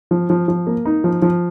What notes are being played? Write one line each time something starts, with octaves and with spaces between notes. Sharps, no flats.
F3
F3
F3
A#3
D#4
F3
F3